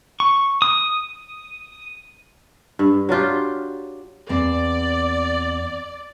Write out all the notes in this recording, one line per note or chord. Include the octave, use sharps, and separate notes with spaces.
C#6
D#6
G2
F#3 D4 F4 G4
E2 C4 D5